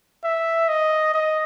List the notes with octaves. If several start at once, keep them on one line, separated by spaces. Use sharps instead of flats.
E5
D#5
D#5